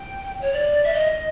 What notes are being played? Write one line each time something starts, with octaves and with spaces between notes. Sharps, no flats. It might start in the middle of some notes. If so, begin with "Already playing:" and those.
Already playing: G5
C#5
D5
E5
D#5